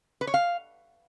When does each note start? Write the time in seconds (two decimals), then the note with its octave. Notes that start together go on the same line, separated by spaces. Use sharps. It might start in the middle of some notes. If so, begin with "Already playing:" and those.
0.21 B4
0.27 C#5
0.34 F5